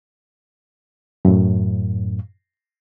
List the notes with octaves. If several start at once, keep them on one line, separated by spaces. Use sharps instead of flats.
F#2 A2